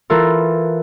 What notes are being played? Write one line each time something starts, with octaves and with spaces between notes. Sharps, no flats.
E3 E4 F4 A4 A#4